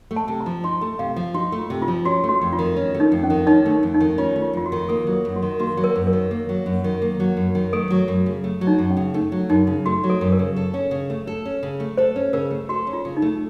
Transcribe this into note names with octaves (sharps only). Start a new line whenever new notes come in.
A3
A5
C3
A#5
F3
D#4 C6
A3
C3 F5
F3
D#4 F#4
A3
F4
C3
F4
F3
C#4 F#4
A3
F#4
F2
F4
D#3
C#4
A3
D#4
F2
C#4
D#3
C#4 D#4
A3
D#4
F2
D#4
D#3
C#4 F4
A3
F4
F2 F4
F#4
D#3
A#3 A4
F#3
A4
F#2
F#4
D#3
A#3 F#4
F#3
A#4
F#2
A#4
D#3
A#3
F#3
F#2
D#3
A#3
F#3
F#2
D#3
A3 A4
F#3
F#2
C#3
A3
F#3
D#4
F#2
C#4
C#3
A3 D#4
F#3
F#2 D#4
C#3
A3 F#4
F#3
A4
F#2
A#4
C#3
A4
C#4
C#3
A3
A4
C#4
C#3
A3
A4 C5
C#4
C#3 A#4
A3
F#4 A4
C#4
F4
C#3
D#4
A3